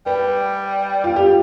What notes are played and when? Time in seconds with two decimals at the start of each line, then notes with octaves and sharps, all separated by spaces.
0.06 G3 B4
1.04 F4
1.16 G4